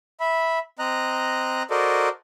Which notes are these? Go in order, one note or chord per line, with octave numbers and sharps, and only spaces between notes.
E5 B5
C4 D#5 A#5 F#6
F#4 A4 A#4 C5 D5 D#5